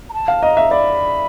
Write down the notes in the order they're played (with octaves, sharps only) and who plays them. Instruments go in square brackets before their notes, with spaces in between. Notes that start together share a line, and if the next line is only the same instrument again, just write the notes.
[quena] A#5
A5
[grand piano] F5
[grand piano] D#5 [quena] A#5
[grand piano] E5
[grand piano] D5 [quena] B5